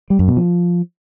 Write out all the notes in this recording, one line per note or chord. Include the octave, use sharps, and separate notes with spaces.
G3
F#2
B2
F3